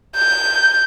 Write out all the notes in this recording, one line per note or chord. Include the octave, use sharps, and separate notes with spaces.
G6